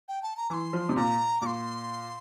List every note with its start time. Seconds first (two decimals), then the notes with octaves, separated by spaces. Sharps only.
0.08 G5
0.22 A5
0.37 A#5
0.50 E3 D6
0.53 C6
0.73 F3
0.89 C3
0.96 A#2 A#5
1.41 A#2 C6 D6